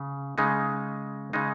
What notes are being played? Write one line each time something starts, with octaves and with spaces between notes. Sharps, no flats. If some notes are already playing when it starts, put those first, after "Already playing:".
Already playing: C#3
C#3 G#3 D#4
C#3 G#3 D#4